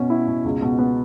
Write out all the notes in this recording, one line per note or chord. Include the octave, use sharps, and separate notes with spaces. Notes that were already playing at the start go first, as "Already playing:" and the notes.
Already playing: B2 C#4
E4
B2
C#2
B2
B3